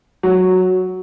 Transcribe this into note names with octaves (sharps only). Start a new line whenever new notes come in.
F#3